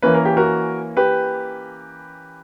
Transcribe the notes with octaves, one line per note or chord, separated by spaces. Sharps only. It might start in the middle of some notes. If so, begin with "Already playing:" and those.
E3 A#3 C#4 B4
A#4
G4
F#4 A#4
G4 B4